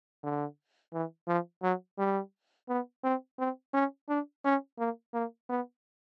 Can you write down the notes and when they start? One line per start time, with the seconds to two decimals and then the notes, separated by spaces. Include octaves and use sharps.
0.24 D3
0.93 E3
1.28 F3
1.63 F#3
1.99 G3
2.69 B3
3.04 C4
3.39 C4
3.74 C#4
4.09 D4
4.45 C#4
4.79 A#3
5.14 A#3
5.50 B3